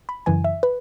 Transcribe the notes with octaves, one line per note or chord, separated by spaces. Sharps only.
B5
F#2 C#3 E3 G#5
E5
B4